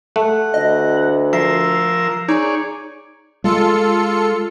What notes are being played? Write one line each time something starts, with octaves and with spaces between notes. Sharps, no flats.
A3 F#5
D2 D#5
F3 A#4 E5 E6 C7
D#4 G#4 C#5 D5
G#3 F4 A4 C#7